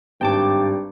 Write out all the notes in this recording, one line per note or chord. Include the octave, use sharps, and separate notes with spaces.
G#1 G2 G5 A5 D6